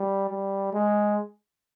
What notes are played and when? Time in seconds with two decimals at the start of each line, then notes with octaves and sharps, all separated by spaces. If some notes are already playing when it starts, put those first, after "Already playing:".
Already playing: G3
0.30 G3
0.73 G#3